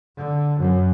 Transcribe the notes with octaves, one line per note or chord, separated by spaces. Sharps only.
D3
F#2